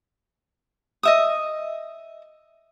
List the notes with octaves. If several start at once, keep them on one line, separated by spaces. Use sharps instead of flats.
D#5 E5 D#6